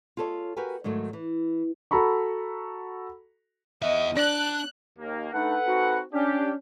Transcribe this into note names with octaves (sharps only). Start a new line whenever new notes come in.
F4 G#4 A4 C5 C#5 D#5
F#4 G4 A#4 B4 G#5
G#2 D#3 F#3 A3
E3
F#4 A4 A#5 B5 C#6
E2 D#5 E5
D4 D5 A5 F#6
D#2 A#3
A3 D4 D#4 A4 B4 F#5
C4 D#4 F#4
C#4 D4 G4